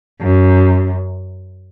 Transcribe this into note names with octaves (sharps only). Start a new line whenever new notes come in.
F#2